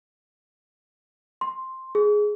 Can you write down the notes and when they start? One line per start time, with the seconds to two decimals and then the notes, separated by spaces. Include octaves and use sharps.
1.41 C6
1.95 G#4